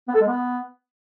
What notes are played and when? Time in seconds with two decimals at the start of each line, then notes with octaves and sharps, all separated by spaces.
0.08 B3
0.14 A4
0.21 G#3
0.27 B3